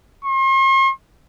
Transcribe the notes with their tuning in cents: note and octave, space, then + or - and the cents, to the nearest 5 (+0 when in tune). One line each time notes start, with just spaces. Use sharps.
C6 +45